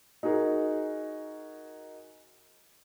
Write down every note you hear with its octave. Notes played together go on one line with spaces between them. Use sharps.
D#4 F#4 G#4 A#4